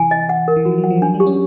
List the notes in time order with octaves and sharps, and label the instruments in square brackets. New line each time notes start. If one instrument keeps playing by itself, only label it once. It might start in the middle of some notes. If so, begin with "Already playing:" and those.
Already playing: [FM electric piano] C3 E3 [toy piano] G#5
[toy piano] D#5
F#5
A#4
[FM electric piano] E3
[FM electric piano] F3 [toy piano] F#4
[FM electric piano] F#3
[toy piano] F#5
[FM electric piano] F3
[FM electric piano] F#3 [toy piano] D4
[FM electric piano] G3
[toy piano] G4
[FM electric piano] C#4